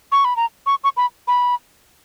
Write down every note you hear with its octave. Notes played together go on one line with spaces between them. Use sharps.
C#6
B5
A#5
C#6
C#6
B5
B5